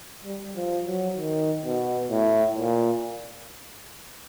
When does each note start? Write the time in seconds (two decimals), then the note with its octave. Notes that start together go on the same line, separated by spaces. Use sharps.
0.24 G3
0.56 F3
0.86 F#3
1.18 D#3
1.64 B2
2.11 A2
2.57 A#2